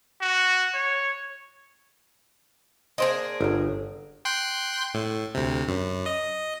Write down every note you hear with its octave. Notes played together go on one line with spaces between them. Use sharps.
F#4
C#5
A#3 D4 G#4 C5 D#5
G1 C#3 F#3
G5 C6 F#6
A2
D2 C3
F#2
D#5